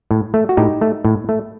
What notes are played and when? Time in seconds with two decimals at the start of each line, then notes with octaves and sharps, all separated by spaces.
0.11 A2
0.34 A3
0.49 F#4
0.57 A2 D#4 G4
0.81 A3
1.05 A2
1.29 A3